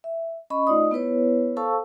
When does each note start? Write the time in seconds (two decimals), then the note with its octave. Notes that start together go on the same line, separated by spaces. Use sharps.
0.04 E5
0.50 C#4 D#5 B5 C#6
0.67 A3 D#4 F4 D5 D#5 D#6
0.91 B3 E4 B4 C#5
1.57 A4 C5 F5 A5 C#6 E6